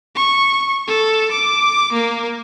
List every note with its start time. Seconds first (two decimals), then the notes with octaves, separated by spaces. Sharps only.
0.16 C#6
0.88 A4
1.32 D6
1.93 A#3